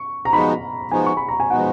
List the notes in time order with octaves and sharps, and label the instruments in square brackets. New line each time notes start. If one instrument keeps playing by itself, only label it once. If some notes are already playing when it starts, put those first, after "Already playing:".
Already playing: [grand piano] C#6
A#5
[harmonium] F3 G#3 B3 D#4 F#4 [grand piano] B5
[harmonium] F3 G#3 B3 D#4 F#4 [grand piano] G#5
[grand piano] C#6
B5
A#5
G#5
[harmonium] F3 G#3 B3 D#4 F#4 [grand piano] F#5